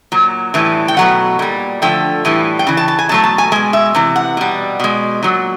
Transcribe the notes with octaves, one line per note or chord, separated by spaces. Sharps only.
A#2 F#3
A2 E3 G3
G5
B2 F#3 A3 F#5
A#2 G3
D3 F3 A3 G5
A2 E3 G3
G5
C#3 E3
A5
A5
G#5
B2 F#3 A3 A5
A5
G#5
B2 G#3 G#5
E5
C3 E3
F#5
B2 G3
B2 G#3
A#2 F#3